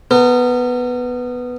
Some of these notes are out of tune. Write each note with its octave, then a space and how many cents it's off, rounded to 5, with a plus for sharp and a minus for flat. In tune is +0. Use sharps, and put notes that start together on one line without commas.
B3 +0 A#4 -40